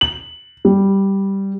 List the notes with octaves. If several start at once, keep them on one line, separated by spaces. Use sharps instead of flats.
F#7
G3